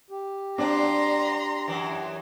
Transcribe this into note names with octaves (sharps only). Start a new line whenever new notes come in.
G4
G2 F#3 C4 D4 A#5 C6
F#2 E3